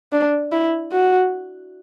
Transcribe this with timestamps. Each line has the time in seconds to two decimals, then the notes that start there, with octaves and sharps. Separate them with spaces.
0.12 D4
0.52 E4
0.92 F#4